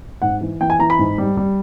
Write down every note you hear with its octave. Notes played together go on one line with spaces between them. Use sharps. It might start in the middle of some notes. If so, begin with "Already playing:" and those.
G#2 F#5
E3
E3 G5
G#5
E3 A#5
B5
G#2
G3
G3